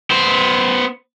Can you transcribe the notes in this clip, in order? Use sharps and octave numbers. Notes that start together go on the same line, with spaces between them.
B3 C5